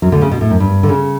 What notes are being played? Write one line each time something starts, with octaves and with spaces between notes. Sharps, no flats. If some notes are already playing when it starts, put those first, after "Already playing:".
F#2 F#3
D2 D3
C#3
B2
A2
F#2
G2
D3
C#3